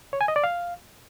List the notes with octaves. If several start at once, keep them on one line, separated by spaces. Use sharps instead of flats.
C#5
G#5
D#5
D5
F5